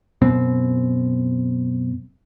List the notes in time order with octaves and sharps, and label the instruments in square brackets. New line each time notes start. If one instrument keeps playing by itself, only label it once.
[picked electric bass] F#2 B2 C4